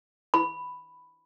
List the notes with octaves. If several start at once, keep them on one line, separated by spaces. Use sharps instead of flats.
B5